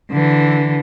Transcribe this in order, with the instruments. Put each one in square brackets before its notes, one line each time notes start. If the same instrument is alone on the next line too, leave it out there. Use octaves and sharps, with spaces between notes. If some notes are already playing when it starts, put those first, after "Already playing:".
[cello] D3 E3